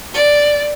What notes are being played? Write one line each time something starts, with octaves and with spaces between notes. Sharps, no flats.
D5